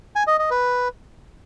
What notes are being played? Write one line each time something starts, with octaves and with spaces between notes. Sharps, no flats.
G#5
D#5
D#5
B4